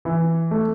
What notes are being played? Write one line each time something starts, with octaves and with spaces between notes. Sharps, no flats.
E3
A3